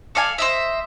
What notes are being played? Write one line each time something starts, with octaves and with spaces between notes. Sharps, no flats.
A4 D5 F5 G#5
C5 D#5 E5